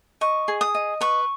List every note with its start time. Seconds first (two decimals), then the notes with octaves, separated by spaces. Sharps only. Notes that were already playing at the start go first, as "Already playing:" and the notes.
0.21 D#5 C#6
0.48 G#4
0.61 D#6
0.75 D#5
1.01 B4 C#6